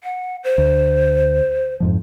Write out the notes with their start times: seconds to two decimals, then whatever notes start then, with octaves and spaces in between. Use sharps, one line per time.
0.04 F#5
0.44 C5
0.58 D2
1.80 F2 G#2 F3